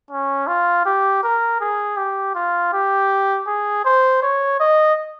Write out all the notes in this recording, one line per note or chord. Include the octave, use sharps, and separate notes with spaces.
C#4
F4
G4
A#4
G#4
G4
F4
G4
G#4
C5
C#5
D#5